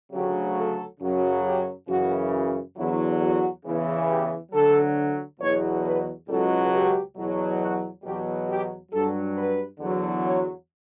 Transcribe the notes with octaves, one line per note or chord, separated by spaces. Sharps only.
D2 C#3 F#3 G4
A4
F#2 C#3 F#3
G4
F#2 C#3 E3 F#4
E2 D3 F#3 E4
F#4
E2 C#3 E3
G4
D2 D3 F#3 A4
E2 B2 F#3 C#5
B4
C#2 B2 F#3 A4
G4
E2 B2 F#3
F#4
E2 B2 F#3 G4
G4
G2 F#3 A4
B4
E2 D3 F#3
C#5